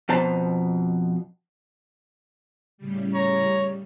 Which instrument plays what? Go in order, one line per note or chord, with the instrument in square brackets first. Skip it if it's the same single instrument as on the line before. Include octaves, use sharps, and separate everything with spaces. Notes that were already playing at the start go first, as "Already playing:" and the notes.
[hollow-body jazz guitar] F2 B2 C5 A5 A#5
[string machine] A2 C#3 G3
[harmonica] C#5 A#5